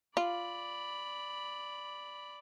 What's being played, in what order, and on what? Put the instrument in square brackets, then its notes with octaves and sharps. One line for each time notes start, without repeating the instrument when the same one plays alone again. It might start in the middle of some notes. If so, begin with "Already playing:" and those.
[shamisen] F4 [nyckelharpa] D5 B5